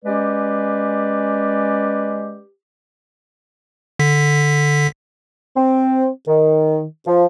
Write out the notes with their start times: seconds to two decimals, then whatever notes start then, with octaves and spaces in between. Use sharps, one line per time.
0.03 G#3 C#4 G4 B4 D5
3.99 D3 B6
5.56 C4
6.27 D#3
7.07 F3